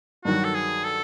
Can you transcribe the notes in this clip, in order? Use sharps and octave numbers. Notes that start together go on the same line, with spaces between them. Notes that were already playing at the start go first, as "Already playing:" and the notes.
G2 D#3 F#3 F#4
A4
G#4
A4